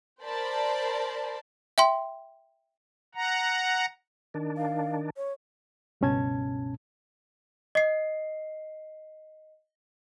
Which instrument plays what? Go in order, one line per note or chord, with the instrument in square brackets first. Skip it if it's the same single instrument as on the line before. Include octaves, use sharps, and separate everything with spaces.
[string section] A#4 C5 D5 A5 B5
[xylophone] E5 G5 C6
[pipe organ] F#5 A#5
[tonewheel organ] D#3 D4
[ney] F5
C#5
[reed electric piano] C#2 G2 B2 C#4 A5 G#6
[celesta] D#5 C7